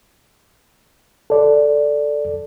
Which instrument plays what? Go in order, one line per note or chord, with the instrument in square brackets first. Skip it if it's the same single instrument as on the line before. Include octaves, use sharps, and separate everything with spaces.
[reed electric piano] A4 D5